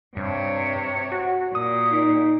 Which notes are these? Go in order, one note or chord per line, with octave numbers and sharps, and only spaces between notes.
G2 C3 C#5
F#4
A#2 D#6
D#4